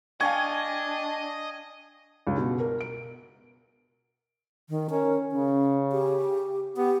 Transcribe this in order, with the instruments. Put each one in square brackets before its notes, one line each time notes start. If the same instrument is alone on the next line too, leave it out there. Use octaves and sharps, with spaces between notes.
[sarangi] D4 [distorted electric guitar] D#5 [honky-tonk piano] F5 G5 C#6 [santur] G#5
[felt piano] C#2
B2
A#4
D7
[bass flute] D#3
[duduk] C#4 [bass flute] A#4
[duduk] C#3 [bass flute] C#4
[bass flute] G4
[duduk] B3 [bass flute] G4